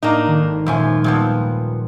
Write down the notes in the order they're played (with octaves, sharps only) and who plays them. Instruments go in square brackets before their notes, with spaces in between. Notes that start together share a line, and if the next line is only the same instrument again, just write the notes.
[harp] A2 [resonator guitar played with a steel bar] A#3 D4 D#4
[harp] G#1 D#3
[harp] D#1 C#5 [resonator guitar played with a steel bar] F#2 F3 G#5
[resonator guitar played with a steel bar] A#2 F3 B3 [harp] G3